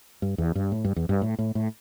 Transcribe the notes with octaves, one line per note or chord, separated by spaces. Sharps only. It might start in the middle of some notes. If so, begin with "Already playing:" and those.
G2
E2
G2
A2
G2
E2
G2
A2
A2
A2